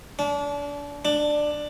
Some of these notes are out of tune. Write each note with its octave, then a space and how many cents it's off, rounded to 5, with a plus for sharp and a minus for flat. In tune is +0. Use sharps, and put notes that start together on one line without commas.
D4 -30
D4 +15